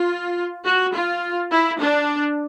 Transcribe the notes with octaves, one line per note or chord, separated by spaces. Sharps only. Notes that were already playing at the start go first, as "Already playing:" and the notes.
Already playing: F4
F#4
F4
E4
D4